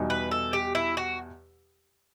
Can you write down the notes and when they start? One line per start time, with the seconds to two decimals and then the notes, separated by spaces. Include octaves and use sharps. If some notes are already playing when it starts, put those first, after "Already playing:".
Already playing: E2 B2 G3 D#4
0.10 B4
0.31 A4
0.53 G4
0.75 E4
0.97 F#4